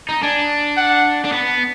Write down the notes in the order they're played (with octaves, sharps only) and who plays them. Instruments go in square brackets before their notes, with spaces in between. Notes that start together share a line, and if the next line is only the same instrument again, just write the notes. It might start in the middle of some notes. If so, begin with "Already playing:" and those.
[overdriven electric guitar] D#4
[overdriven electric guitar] D4 [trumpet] G#5
[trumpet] F#5
[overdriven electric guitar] D4
B3